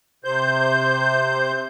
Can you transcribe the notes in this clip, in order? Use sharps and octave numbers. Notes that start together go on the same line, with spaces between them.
C3 C5 G6